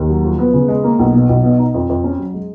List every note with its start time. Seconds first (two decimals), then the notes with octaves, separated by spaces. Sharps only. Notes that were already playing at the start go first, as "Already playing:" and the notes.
Already playing: D#2
0.09 F#3
0.24 F3
0.39 B3
0.54 C#3
0.68 G#3
0.84 A#3
0.99 B1
1.14 B2
1.29 B1
1.44 B2
1.59 D#4
1.74 F2
1.89 F2
2.04 C#4
2.19 F#3
2.34 G#3